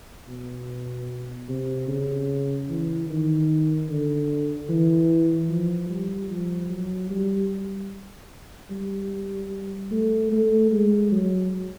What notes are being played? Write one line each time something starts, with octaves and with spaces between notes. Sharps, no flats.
B2
C3
C#3
E3
D#3
D3
E3
F3
G3
F3
F#3
G3
G3
A3
A3
G#3
F#3